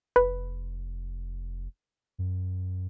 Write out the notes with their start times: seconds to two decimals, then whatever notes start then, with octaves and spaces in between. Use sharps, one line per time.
0.16 F1 B4
2.18 F#2